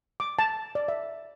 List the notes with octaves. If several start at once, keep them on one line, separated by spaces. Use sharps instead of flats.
D6
A5
D5
E5